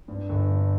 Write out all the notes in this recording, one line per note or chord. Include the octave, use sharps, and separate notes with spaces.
G2
G1
G2